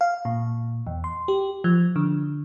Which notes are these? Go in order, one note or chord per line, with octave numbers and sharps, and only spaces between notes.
F5
A#2
E2
C6
G4
F3
D3